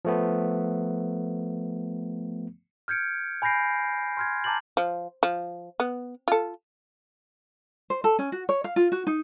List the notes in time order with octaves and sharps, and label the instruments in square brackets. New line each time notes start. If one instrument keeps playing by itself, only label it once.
[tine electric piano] F3 A3 B3
[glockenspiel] F6 G6 G#6 C#7 D7
G#5 B5 G6 A#6 C7 D7
C6 F6 G#6
A5 A#5 D6 G6 A6 F#7
[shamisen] F3
F3
B3
F4 A4
[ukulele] C5
A4
C#4
F#4
C#5
F5
F4
F#4
D#4